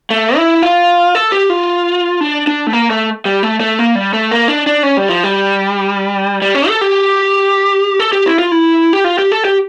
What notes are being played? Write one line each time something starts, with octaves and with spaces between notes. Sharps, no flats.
A3
E4
F4
A4
G4
F4
D4
D4
A3
A#3
A3
G3
A3
A3
A#3
G3
A3
A#3
D4
D4
C#4
G3
F3
G3
G3
C#4
A4
G4
A4
G4
E4
F4
E4
G4
F4
G4
A4
G4